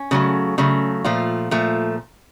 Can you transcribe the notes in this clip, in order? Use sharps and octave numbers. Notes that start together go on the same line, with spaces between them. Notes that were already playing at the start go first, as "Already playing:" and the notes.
Already playing: C#4
C#3 F#3 A3
C#3 F#3 A3
A#2 F3 A3 F4
A#2 F3 A3